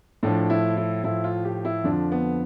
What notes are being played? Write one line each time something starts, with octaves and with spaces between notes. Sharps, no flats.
A2 F3 D4
E4
E4
A2 F3 E4
F4
G4
E4
F2 D3 F3 D4
B3